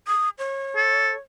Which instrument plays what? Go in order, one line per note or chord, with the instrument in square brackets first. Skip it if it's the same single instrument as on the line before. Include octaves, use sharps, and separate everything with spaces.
[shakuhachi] D#6
C#5
[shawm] A4